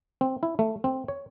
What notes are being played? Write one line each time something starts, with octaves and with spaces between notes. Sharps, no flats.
C4
E4
A3
C4
C#5